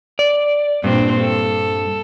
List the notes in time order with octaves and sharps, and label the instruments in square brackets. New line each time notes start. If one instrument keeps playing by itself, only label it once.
[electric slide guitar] D5
[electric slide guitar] G2 [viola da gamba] A#2 C4 D4
[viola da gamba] A4